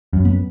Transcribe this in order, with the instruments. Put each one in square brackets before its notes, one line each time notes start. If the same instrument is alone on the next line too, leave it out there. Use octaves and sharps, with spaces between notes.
[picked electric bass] F#2
[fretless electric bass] B3